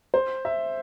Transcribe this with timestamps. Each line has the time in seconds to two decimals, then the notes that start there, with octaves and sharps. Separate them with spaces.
0.14 C5
0.45 E5